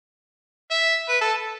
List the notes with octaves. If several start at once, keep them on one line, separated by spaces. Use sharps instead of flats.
E5
B4
A4